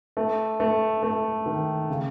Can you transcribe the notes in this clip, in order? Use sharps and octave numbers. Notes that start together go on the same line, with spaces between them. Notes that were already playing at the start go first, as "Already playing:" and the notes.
A3
A3
A3
D#3
C#3